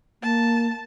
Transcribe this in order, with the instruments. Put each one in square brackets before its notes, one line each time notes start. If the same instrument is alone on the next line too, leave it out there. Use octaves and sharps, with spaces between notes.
[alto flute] A#3 [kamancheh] A5